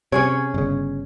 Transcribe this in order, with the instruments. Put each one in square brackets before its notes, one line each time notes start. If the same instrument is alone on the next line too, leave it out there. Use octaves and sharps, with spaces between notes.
[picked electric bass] C3 [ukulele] C#4 G#4 C#5
[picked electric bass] G1 C#3